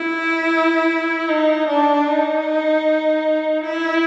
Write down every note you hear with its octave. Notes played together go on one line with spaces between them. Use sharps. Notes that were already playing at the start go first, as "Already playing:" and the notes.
Already playing: E4
D#4
D4
D#4
E4